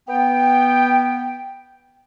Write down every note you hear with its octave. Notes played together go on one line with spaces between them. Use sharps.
B3 G5